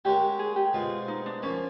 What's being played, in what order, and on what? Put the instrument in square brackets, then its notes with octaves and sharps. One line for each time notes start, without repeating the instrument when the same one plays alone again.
[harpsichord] G#3 C#4 F#4 A#4 [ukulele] G4
[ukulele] G#4
G4
[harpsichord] B2 G#3 C4 [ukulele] F4
[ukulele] D#4
D4
[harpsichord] F3 A#3 [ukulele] C#4